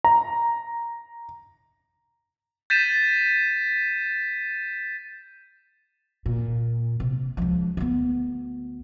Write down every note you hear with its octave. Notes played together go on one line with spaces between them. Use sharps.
A#5
G6 A6 B6 D#7 E7
A#2
C3
C#2 F3
D2 B3